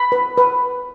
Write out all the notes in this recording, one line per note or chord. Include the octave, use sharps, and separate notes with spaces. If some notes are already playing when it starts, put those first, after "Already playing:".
Already playing: B5
B4
B4